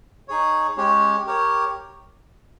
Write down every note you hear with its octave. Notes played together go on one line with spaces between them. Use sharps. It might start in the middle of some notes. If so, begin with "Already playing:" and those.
D#4 G#4 C#5
G#3 C#4 G4 C#5
G4 A#4 C#5